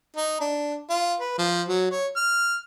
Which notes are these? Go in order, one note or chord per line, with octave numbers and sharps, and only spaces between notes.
D#4
D4
F4
B4
F3
F#3
C#5
F6